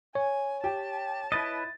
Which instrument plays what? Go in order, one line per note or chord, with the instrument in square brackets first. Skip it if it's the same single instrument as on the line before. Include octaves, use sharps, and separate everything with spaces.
[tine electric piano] C#5 [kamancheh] G#5
[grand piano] G4 [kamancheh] A5
[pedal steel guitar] E4 B4 D#5 [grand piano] A6